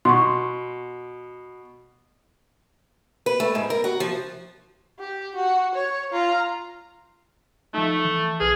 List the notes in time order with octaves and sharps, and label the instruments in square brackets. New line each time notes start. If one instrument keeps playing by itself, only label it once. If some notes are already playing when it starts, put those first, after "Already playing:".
[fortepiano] B2 [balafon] C6 C#6
[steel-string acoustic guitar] B4
A3
G#2
A#4
F#4
F3
[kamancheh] G4
F#4
C#5
F4 A#5
[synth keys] F3 D#4 [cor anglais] A3
[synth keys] E3
[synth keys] B1 B4 F6 [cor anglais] G#4